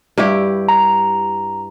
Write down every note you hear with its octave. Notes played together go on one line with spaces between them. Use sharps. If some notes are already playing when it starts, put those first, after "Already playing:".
G2 E4 G4
A#5